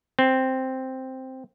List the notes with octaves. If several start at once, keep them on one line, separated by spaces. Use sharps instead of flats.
C4